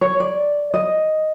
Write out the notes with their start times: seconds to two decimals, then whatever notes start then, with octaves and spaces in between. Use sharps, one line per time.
0.01 C#5
0.20 D5
0.74 D#5